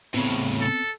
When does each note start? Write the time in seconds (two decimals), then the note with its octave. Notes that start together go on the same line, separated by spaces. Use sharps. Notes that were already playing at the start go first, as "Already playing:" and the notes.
0.14 A2 C#3 B3 C4
0.61 A4